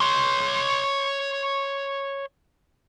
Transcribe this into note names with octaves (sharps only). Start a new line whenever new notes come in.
C#5 C6